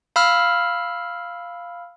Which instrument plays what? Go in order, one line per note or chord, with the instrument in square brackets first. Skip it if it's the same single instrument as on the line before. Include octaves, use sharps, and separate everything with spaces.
[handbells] F5 B5 E6 F6